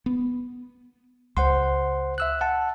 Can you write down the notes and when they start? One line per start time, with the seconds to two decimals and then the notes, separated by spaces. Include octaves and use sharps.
0.06 B3
1.37 C#2 C5 F#5 C6
2.18 E5 E6 F#6
2.41 F#5 A5